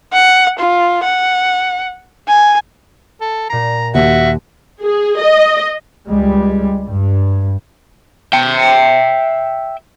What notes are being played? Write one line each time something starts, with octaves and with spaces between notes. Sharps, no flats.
F#5
F4
F#5
G#5
A4
A#2 A#5 C7
D#2 F#4 E5
G#4
D#5
C#2 G3 G#3
G2
E5 G5